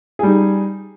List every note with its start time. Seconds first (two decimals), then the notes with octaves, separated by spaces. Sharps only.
0.19 G#4
0.23 G3
0.27 D#4